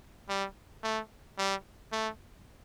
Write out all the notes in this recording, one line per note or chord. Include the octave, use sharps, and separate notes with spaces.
G3
A3
G3
A3